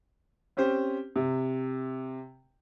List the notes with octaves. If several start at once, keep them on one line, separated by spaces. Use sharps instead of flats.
C4 C#4 G4 C5
C3